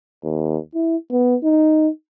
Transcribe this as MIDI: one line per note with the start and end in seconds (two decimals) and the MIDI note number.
0.24 0.58 39
0.75 0.97 64
1.11 1.36 59
1.43 1.89 63